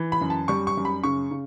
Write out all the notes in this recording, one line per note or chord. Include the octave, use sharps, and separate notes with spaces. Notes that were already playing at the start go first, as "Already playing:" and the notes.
Already playing: E3
B5
F#2
A5
G3 C#6
C#6
F#2
B5
C#3 C#6
C#3